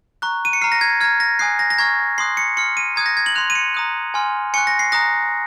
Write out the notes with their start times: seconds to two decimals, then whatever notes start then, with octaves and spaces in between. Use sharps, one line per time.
0.22 A#5 C#6 F#6
0.45 D#7
0.53 C#7
0.61 A#5 F6 C7
0.72 A#6
0.81 G#6
1.01 F6 G#6
1.04 A#5
1.20 A#6
1.39 G#5 D#6 F#6 C7
1.59 A#6
1.70 A#6
1.78 A#5 C#6 F6 G#6
2.18 C6 D#6 F#6 C7
2.37 C#7
2.57 C6 F6 C#7
2.77 D#7
2.96 A#5 D#6 F#6 G#6
3.06 A#6
3.17 G#6
3.26 F#7
3.35 C6 F#6 F7
3.50 D#7
3.55 C#7
3.74 A#5 D#6 F#6
4.14 G#5 C6 F6
4.54 G#5 C#6 F#6 C#7
4.67 A#6
4.79 C7
4.92 A#5 D#6 F#6 A#6